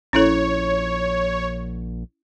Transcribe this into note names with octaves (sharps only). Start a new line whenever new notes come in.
A#1 C#4 E4 A4 C#5